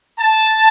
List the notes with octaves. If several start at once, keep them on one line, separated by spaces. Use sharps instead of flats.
A5